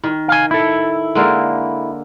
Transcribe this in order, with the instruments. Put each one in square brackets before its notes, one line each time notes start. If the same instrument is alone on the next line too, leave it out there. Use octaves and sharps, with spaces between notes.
[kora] D#3
[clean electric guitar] F5 G#5
E4 A4
[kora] D3 G#3 A#3